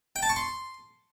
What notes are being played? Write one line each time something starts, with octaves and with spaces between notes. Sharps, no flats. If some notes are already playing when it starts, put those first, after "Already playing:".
G5
A5
C#6
C6